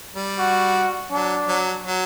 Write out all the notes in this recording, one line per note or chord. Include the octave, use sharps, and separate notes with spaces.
G3
F#4
F#3 D4
F#3
F#3